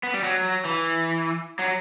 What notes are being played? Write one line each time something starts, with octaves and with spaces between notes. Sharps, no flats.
B3
G3
F#3
E3
F#3